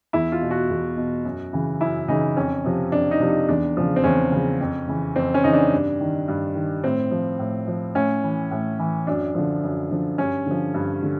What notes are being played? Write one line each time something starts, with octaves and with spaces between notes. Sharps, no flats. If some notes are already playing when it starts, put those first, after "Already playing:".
E2 E4
F4
B2
F#4
E2
B2
F#2
C#3 E3
F#2 E4
C#3 E3 D#4
F2 C#4
C3 F3
F2 D4
D#4
C3 F3
D#4
E2 D4
C#3 F3
C4
E2 C#4
C#3 F3
F2
C#3 E3
F2 C4
C#4
C#3 E3 D#4
D4
G2
D#3
G2
D#3
A2 C4
F3
A2
F3
A2 C#4
E3
A2
E3
F#2 D4
D3 F3
F#2
D3 F3
G2 C#4
D3 F3
G2
D3